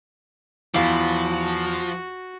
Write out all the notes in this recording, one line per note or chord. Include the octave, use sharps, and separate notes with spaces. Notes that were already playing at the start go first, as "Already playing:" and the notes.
E2 F3 E4 F#4 F5